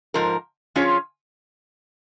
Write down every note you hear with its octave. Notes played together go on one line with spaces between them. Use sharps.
G#2 F3 A#4
F3 C#4 F4 G#4 C#5